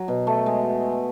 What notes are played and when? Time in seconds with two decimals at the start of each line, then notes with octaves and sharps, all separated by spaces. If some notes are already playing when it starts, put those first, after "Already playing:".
Already playing: F#3
0.08 B2
0.27 A3
0.46 G#3